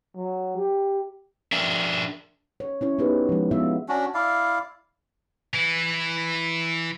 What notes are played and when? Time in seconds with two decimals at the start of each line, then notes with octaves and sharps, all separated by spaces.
0.16 F#3
0.57 G4
1.52 D4 A#4 E5 G5
2.60 C#5
2.81 C#4 E4 C#5
2.99 B3 D#4 G4 G#4 B4
3.29 F3 G#3
3.51 B3 D4 E4 F4 E5
3.89 C#4 D4 F#4
4.14 E4 D5 F5
5.53 E3 E4